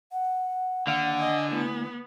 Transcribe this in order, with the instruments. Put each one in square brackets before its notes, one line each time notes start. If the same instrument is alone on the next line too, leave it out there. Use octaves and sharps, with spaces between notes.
[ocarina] F#5
[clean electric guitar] D#2 F5 [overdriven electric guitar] D3 [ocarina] F#5
[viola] D#5 G#5
[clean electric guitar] D2 [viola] B3 [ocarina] E4